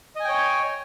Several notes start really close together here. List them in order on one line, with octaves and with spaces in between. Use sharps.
D#5 G#5 G5 C#5